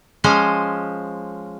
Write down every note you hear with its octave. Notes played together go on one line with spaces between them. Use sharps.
F3 G#3 C#4 C5 G#5